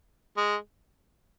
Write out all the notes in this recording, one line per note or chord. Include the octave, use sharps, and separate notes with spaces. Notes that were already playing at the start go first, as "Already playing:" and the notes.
G#3